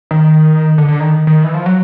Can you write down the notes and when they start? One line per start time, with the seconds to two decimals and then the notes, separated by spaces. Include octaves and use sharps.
0.11 D#3
0.78 D3
0.88 D3
1.00 D#3
1.27 D#3
1.44 E3
1.54 F3
1.66 F#3